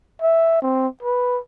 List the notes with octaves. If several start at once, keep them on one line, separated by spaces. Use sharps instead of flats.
E5
C4
B4